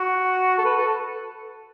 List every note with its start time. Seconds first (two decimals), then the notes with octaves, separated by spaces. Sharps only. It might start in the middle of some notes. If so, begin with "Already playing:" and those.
Already playing: F#4
0.58 A4
0.65 B4
0.77 A4